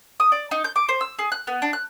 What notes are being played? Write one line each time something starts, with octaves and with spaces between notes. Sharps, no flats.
D#6
D5
D#4
G6
D6
C5
E6
G#4
F#6
B3
D4
F#6